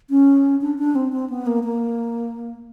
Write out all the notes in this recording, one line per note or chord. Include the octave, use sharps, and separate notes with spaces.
C#4
D4
D4
C4
C4
B3
A#3
A#3